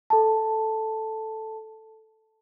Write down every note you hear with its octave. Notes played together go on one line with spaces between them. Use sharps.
A4 A5